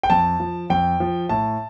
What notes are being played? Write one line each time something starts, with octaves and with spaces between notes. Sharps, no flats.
G5
F2 A5
F3
F2 G5
F3
A2 A5